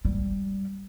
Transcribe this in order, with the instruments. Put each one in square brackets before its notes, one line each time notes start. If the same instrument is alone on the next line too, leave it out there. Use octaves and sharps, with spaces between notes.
[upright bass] G3